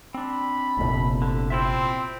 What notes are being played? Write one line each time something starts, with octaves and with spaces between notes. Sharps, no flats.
C4 D4 B5
G1 C2 F2 A#2
D3
C4 E4 F4 E5